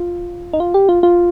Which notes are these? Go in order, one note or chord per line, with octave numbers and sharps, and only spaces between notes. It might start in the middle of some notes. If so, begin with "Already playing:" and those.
Already playing: F4
D#4
F4
G4
F4
F4